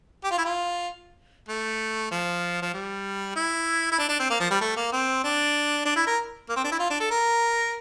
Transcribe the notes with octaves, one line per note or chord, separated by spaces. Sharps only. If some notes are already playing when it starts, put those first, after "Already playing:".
G4
F4
E4
F4
A3
F3
F3
G3
E4
E4
D4
D4
C4
A#3
F3
G3
A3
A#3
C4
D4
D4
E4
A#4
A#3
C4
D4
E4
F4
D4
A4
A#4